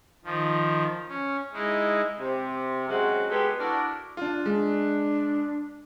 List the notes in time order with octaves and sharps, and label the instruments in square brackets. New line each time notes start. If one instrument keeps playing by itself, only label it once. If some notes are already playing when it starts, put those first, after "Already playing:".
[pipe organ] D#3 F3
C#4
G#3 D#4 E4
[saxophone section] C3
F#3 G#3 C4 C#4 F#4
G#3 B3 G4 A4
D4 E4 F#4 A#4 D5
[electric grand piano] D4 F4
[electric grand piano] G#3 [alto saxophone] D4